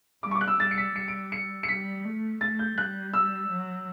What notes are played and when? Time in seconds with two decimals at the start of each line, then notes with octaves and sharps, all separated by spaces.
0.23 G3 D6
0.31 C#6
0.35 D6
0.41 F#6
0.47 E6
0.60 G3 A6
0.71 C#7
0.77 B6
0.96 G3 C#7
1.08 D7
1.32 C#7
1.63 C#7
1.68 G3 B6
2.05 A3
2.41 A3 A6
2.59 G6
2.78 G3 F#6
3.14 E6
3.50 F#3